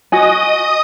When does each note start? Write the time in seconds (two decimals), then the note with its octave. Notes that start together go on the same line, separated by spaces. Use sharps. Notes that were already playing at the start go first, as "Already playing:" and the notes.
0.12 F#4 D#5 G#5 D#6